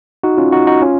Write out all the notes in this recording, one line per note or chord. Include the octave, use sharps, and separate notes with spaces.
D#4 F#4
C#4 F4
D#4 F#4
D#4 F#4
C#4 F4